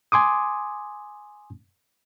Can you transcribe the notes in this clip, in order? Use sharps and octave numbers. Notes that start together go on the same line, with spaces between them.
G#5 C6 D6 D#6